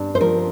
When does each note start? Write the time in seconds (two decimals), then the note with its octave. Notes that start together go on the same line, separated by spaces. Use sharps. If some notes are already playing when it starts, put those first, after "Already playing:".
Already playing: G2
0.15 C5
0.21 F3 A#4